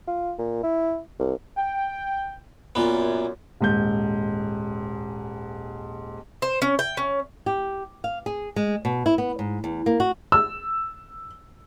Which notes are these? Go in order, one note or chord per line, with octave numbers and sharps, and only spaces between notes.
F4
A#2
E4
C2
G5
F#2 A#2 B3
D#1 G#2 G6
C5
C#4
G5
C#4
G4
F5
G#4
G#3
B2
E4
B3
G#2
E2
A#3
F#4
E6